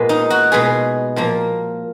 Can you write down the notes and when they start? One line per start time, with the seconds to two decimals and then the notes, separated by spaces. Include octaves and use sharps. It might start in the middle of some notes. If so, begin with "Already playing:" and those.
Already playing: A#2 G#3 B3
0.09 D#4
0.30 F#4
0.52 B2 G#3 B3 G#4
1.16 A#2 F3 A#3